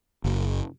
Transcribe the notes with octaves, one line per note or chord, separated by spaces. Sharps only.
F#1